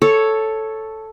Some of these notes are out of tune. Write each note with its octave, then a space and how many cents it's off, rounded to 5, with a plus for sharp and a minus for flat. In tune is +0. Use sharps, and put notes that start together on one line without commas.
A4 +0 C#5 +0